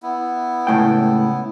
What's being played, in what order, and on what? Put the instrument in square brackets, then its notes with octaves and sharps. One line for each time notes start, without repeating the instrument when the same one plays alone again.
[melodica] B3 E4
[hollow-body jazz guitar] C#2 A2 G5